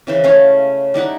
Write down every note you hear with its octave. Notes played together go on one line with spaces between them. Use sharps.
C#3 E3 C5
A3 C#4 F5
G3 D#4 E4 F#5